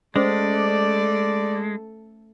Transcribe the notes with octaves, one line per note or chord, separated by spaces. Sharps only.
G#3 A3 C#4 A4 C5 D5